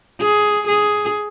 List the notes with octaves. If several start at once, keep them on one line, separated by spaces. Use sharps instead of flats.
G#4
G#4